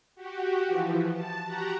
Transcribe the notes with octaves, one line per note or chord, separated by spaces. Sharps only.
F#4 G4
E3 F3
A5
F#4 G4 F#5 A#5